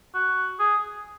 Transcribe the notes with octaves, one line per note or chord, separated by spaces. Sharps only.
F#4
G#4